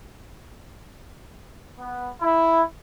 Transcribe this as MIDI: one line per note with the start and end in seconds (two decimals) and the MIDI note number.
1.81 2.10 59
2.22 2.62 64